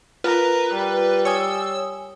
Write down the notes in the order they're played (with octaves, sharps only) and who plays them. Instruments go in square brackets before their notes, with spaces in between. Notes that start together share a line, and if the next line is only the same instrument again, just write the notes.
[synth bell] F4 [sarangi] A#4 [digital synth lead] B4
[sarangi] G3
[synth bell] C#5 G#5 D#6 [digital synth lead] E6